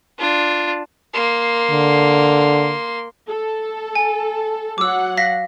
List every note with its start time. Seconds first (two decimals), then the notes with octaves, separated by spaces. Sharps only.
0.19 D4 F4
1.13 A#3 C6
1.71 D3
3.28 A4
3.95 G#5
4.78 F#3 F#5 D6 E6
5.17 F5 A#6 B6